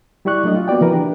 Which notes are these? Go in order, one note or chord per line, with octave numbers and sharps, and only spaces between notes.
G3 E4 G4 D5 C#6 F#6
F#3 A3 D4 D#5
F4
A#3 B3 F#4 D5 G5
E3 F3 A#4 B4
D4 G4 A#4